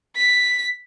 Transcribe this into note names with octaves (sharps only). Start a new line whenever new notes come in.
B6